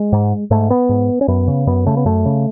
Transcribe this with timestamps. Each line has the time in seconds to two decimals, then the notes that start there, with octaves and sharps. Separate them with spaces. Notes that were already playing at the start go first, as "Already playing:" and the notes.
Already playing: G#3
0.12 G#2
0.51 G#2 A3
0.70 B3
0.89 G#2
1.21 C#4
1.28 F#2 B3
1.48 C#3
1.67 F#2 B3
1.86 C#3 A3
1.97 B3
2.05 F#2 A3
2.25 C#3